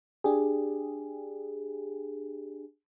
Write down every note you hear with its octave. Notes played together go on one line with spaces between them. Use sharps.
D4 G4 G#4